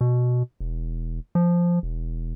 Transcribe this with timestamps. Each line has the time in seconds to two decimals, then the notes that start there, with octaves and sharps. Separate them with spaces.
0.01 B2
0.60 E1
1.35 F3
1.83 E1